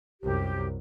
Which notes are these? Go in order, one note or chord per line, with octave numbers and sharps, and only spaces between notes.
C2 F#2 G4